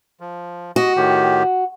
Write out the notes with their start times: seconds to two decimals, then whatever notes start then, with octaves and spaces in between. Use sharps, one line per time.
0.20 F3
0.76 F#4 D#5
0.96 A2 D#3 G4